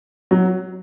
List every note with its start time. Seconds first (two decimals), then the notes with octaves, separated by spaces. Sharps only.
0.31 F#3